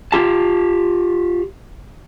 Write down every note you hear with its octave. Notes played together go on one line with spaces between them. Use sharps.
F4 G4 A5